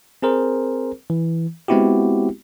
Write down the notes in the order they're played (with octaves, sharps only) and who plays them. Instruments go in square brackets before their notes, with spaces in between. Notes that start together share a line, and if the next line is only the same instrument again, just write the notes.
[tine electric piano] C4 G#4 A#4 C5
E3
G#3 B3 C4 E4 F#4 G4